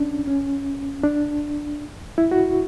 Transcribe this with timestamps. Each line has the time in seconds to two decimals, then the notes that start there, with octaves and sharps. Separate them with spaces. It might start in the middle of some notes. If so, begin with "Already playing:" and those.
Already playing: C#4 D4
0.27 C#4
1.03 D4
2.18 E4
2.31 F#4